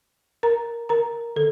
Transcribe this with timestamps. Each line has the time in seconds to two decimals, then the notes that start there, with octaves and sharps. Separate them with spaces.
0.43 A#4 A#5
0.89 A#4 A#5
1.36 D3 A4